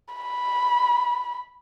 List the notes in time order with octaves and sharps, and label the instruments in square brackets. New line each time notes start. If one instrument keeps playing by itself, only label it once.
[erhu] B5